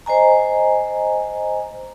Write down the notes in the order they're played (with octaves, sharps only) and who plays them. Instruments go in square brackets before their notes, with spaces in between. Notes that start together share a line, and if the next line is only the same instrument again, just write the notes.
[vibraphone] C5 D#5 G#5 A#5